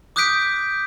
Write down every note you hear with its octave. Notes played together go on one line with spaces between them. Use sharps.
D6 D#6 F#6 G6 B6 D7